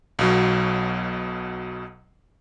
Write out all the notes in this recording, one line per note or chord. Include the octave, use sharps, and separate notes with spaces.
B1 B2 F#3